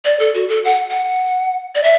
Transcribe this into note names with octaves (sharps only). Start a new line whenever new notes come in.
D5
A4
F#4
A4
F#5
F#5
D5
E5